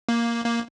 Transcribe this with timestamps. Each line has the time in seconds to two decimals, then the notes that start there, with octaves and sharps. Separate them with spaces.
0.09 A#3
0.45 A#3